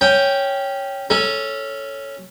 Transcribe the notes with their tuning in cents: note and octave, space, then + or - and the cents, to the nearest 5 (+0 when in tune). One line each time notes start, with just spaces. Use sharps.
C#4 +0 G5 +0
C#4 +0 A4 +0